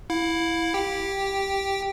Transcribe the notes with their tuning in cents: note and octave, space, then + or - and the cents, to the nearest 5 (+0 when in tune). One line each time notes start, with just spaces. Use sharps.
E4 +0 F5 +35
G4 +0 G5 +0